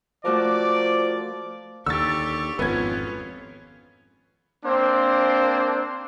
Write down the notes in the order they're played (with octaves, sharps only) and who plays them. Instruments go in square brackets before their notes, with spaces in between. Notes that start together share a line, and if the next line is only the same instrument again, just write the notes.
[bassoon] F3 [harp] A3 F#4 A#4 [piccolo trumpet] D5 [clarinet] D6
[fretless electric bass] D#2 D3 [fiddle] G4 C#6 [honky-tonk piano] E6 A6
[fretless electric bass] G#1 F2 [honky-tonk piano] B3 G#6 [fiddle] C#4 F4
[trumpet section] A#3 C4 D4 C5